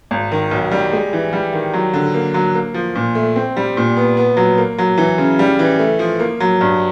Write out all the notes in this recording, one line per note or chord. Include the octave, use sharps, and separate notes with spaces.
G#1
D#3
B1
G3
G#3
E3
G3
D#3
F#3
D3
A#3
F#3
A#3
F3
A#2
A3
C4
G3
A#2
B3
B3
F#3
A#3
F#3
E3
C#3
G3
E3
A3
F3
A#3
F#3
G2